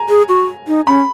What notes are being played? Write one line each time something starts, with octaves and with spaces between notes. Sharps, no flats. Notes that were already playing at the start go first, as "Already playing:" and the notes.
Already playing: G#5 A#5
G#4
F#4
D#4
C#4 B5